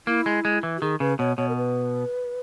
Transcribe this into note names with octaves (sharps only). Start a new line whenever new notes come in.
A#3 E4
G#3
G#3
E3
F#4
D#3 G#4
C#3 B4
B2 C#5
B2 C#5
A#4
B4